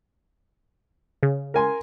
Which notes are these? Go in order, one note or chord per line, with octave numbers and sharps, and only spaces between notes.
C#3
A#4 G#5 C6